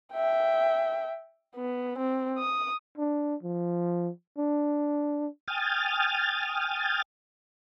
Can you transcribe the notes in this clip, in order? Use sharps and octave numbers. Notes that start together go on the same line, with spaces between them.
E5 G5
B3
C4
D#6
D4
F3
D4
G5 G#5 D#6 F6 A6